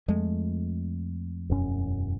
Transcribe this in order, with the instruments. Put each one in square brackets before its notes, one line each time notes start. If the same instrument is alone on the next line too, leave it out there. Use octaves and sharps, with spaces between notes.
[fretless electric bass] F2 G#3 A3
[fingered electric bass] E1 F#2 C#4